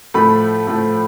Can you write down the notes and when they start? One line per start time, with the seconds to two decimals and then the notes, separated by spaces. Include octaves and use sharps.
0.14 A2 F3 A3 B5
0.67 A2 F3 A3